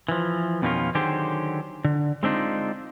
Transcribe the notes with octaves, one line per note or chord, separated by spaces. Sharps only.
E3 F3
F2 B2 D#3 A#3 C#4 F4
D3 D#3 F#3 G4 G#4 C5
D3
G#3 C4 D4 D#4 F4